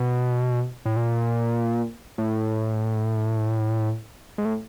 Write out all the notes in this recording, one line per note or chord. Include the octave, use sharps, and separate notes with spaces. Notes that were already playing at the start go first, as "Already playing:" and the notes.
Already playing: B2
A2
A#2
A2
G#2
A2